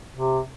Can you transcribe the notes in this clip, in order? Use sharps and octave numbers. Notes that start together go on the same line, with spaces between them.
C3